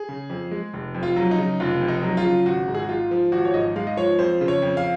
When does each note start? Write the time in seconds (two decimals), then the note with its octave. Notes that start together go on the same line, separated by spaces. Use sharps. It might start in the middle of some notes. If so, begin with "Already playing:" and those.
Already playing: G#4
0.09 C#3
0.30 F2
0.51 G#3
0.74 F1
0.95 F2
1.03 F4
1.16 F#3
1.31 D#4
1.38 C#3
1.60 F1 F4
1.81 F2
1.88 D#4
2.03 F#3
2.17 F4
2.24 C#3
2.46 G#1 F#4
2.68 G#2
2.75 G#4
2.82 F#4
2.89 G#3 F4
3.11 F3
3.32 G#1 F#4
3.45 C#5
3.54 G#2 D#5
3.76 G#3 F5
3.87 D#5
3.97 F3 C#5
4.19 F2 C5
4.41 C#3
4.48 C#5
4.62 F2
4.77 F5